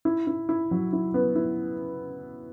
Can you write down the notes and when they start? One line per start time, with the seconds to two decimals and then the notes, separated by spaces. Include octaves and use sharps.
0.05 E4
0.27 E4
0.49 E4
0.71 F#3
0.93 E4
1.14 B3
1.36 E4